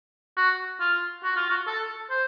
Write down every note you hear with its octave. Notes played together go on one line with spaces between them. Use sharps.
F#4
F4
F#4
F4
F#4
A4
C5